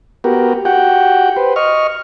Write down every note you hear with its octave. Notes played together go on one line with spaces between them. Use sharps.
B3 F#4 G4 A#4
F#4 G4 F#5 G5
B4 C5
D#5 C#6 F6